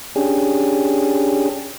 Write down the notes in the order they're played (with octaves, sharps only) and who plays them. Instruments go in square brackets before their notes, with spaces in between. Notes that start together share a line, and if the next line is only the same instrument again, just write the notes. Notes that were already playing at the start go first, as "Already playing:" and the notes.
[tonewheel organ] C#4 D4 G4 G#4